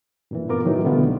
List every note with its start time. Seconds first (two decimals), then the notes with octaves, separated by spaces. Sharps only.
0.31 G2 A#2 E3
0.49 A#3 B3 F4 A#4 D6
0.65 A2 D#3 E3 F#3 D#4
0.84 B2 D3 G3 A3 B3 F4
1.05 C2